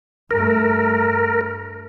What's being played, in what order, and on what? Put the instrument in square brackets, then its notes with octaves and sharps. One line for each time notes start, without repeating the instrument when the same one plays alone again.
[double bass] G2 A3 [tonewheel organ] A#4